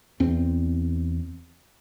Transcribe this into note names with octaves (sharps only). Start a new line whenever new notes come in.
E2 C4